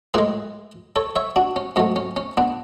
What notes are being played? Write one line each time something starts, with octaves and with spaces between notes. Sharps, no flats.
A2 G#3 G#4 B4
A4 C#5
C#5 E5
D4 F#4
C#4
G#2 F#3 A3 C#4
C#4
C#4
B3 D4